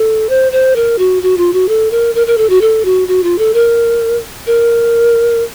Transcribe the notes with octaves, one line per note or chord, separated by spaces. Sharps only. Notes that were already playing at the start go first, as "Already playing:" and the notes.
Already playing: A4
C5
C5
A#4
F#4
F#4
F4
F#4
A4
A#4
A#4
A#4
A4
F#4
A4
F#4
F#4
F4
A4
A#4
A#4